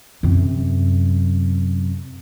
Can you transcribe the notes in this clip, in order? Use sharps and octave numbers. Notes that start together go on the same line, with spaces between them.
F#2 C3